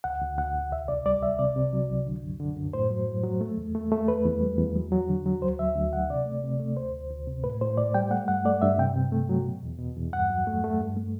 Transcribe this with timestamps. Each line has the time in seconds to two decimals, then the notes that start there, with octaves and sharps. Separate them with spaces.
0.04 D2 F#5
0.22 D2
0.38 D2 F#5
0.55 D2
0.72 C2 E5
0.88 C2 D5
1.06 G3 D5
1.22 C2 E5
1.39 C3 D5
1.56 C3
1.73 F#3
1.90 C2
2.06 D3
2.23 F#2
2.40 D3
2.57 F#2
2.73 A2 C5
2.90 F#3
3.07 A2
3.23 F#3
3.41 A3
3.57 E2
3.75 A3
3.92 A3
4.08 E2 B4
4.25 E2
4.41 G3
4.58 E2
4.76 F#3
4.92 F#3
5.09 D3
5.26 F#3
5.42 D2 C5
5.59 D2 E5
5.76 D2
5.93 D3 F#5
6.10 C3 D5
6.26 A3
6.44 C3
6.60 A3
6.77 D2 C5
6.93 D2
7.10 D2
7.27 C3
7.44 A2 B4
7.61 A2 C5
7.78 A2 D5
7.94 G3 G5
8.11 A3 F#5
8.28 G2 F#5
8.45 A3 D5
8.62 G2 E5
8.79 C3 G5
8.95 C3
9.12 A3
9.29 F#3
9.46 B2
9.63 E2
9.79 B2
9.96 E2
10.13 G2 F#5
10.30 F#3
10.47 A3
10.64 A3
10.80 G2
10.97 A3